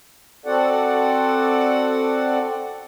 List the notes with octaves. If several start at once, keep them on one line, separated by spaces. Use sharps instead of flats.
C4 F#4 A4 D5 F#5